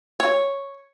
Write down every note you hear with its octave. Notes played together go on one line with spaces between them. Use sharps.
C#5